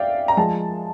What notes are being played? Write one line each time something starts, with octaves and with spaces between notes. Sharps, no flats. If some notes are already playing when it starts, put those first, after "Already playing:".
Already playing: D5 E5 F5 G5
A#5
F3 G#3 A5